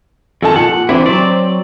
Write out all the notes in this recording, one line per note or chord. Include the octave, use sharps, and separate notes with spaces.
F2 D#3 A4 G#5 A5
A#2 F#5
E3 C4 D4 E4
F#3 D5